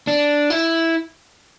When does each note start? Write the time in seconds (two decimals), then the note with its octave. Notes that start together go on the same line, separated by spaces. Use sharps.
0.07 D4
0.50 E4